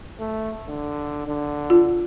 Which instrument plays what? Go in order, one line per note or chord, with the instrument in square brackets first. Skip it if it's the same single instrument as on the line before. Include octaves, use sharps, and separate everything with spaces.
[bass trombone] A3
D3
D3
[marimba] F4